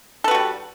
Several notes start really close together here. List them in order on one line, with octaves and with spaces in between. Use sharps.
A4 B4 F#4 G3